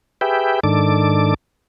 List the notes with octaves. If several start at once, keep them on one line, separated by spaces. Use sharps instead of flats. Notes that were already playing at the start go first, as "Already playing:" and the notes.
G4 G#4 B4 E5 G5
G#2 D#3 D4 A4 D6